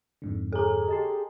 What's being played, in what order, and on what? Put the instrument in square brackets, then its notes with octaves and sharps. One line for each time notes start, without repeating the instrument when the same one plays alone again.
[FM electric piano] F2 G#2 D3
[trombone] G#4 [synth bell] A4 A#5
[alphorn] G4 [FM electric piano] D#5 A5 C6